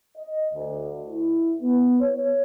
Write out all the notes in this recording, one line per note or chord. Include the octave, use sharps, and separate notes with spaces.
D#5
D2
E4
B3
C#5